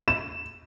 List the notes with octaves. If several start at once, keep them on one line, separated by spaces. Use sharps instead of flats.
E7